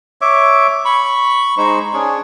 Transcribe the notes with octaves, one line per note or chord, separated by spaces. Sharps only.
C#5 E5 D6
B5 C#6
G#3 D#4 C5 C#6
C#4 D4 G#4 C#5